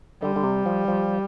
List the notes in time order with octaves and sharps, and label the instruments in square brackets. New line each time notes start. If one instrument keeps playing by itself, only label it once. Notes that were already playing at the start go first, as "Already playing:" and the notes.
[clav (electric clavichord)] D3 [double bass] G3
[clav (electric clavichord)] D3
C3
F3
F3